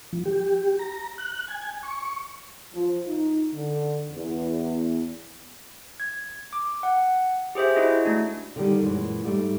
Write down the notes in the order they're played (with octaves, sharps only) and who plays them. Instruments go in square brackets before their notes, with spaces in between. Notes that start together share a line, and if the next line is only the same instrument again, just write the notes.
[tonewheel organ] F3
G4
A#5
F#6
G#5
C#6
[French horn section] F3
D#4
D3
E2
[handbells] G#6
D6
F#5
G4 G#4 C5 E5
E4 F#4 G#4 D#5
A3 D4
[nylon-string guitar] D3 D#3 G3
F#2 A#2 E3 G#3
G#2 G3 A3